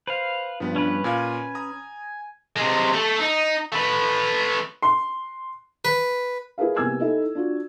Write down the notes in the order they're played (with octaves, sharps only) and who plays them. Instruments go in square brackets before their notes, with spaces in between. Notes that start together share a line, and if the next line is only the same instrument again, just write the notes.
[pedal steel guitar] B4 F5 [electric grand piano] C5
[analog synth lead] G2 [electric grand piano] F3 B3
[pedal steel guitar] C#4 B4
[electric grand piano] A#2 F4 F5 [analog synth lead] G#5
[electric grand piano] A#5 D#6
[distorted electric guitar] C3 G#3
A3 A4
D#4
A3 B4
[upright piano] C6
[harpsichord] B4
[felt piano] E4 G#4 A#4 B4 F5
C2 A#3 B3 G#5 E6 G#6
D#4 E4 A4 E5
D4 F4 F#4